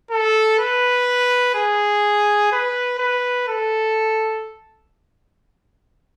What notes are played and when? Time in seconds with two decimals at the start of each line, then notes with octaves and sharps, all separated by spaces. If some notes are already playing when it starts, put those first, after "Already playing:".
0.11 A4
0.59 B4
1.55 G#4
2.52 B4
2.99 B4
3.48 A4